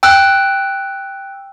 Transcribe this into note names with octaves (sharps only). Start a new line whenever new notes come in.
G5 E6 F#6